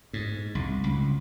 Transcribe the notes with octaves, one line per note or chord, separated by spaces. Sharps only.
G#2
C2
C#2